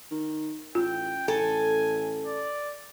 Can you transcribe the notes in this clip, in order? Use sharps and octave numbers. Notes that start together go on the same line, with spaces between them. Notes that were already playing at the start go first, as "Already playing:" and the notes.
D#3
A1 F4 G5
A1 A4 G#5
D5